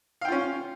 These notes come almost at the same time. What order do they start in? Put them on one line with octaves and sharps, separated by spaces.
F5 G5 F4 C#4